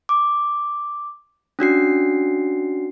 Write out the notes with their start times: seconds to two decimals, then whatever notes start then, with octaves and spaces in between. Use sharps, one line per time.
0.09 D6
1.59 C#4 D4 F#4 C7